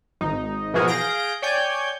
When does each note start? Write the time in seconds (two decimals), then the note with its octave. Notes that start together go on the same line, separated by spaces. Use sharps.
0.21 G#1 D#4
0.74 B2 E3 F3 F#4 G#4 A#4
0.88 G#4 F5 G6 A#6 D7
1.42 C#5 D5 G5 G#5 G6